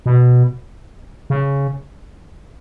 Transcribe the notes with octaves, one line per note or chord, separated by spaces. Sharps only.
B2
C#3